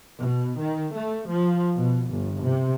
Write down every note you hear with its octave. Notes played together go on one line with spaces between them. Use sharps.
B2
D#3
A3
F3
B2
G1
C3